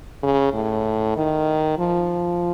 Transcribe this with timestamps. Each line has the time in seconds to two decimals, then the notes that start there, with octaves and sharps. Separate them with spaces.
0.23 C#3
0.54 A2
1.17 D#3
1.78 F3